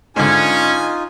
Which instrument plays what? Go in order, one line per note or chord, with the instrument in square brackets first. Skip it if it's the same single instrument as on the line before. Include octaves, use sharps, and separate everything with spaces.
[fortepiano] G#2 D3 [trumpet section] C#4 [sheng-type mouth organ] D#4 F4 [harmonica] G#5